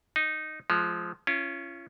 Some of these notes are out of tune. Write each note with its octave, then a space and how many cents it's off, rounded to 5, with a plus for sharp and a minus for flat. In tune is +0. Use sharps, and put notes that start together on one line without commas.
D#4 -5 D#5 +0
F3 -5 G#3 +30
C#4 +0 F4 -40